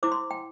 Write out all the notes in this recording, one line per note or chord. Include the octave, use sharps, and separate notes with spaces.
E4 C5 D6
C6
G5